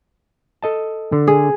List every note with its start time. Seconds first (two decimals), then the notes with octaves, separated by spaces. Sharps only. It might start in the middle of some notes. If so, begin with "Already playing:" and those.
0.62 A4 D#5 A5
1.12 D3
1.28 G#4